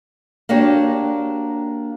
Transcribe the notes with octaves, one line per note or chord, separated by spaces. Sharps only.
A#3 D4 F#4 G4 C#5